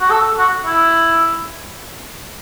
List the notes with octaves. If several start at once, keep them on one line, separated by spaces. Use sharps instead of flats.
F#4
A4
F#4
E4